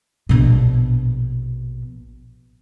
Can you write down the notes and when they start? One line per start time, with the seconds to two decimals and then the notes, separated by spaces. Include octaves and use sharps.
0.29 A#1 B2